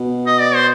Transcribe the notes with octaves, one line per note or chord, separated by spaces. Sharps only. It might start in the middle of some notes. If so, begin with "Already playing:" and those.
Already playing: B2
D#5
D5
C5